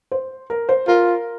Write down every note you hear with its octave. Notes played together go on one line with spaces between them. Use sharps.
C5
A#4
C5
F4 A#4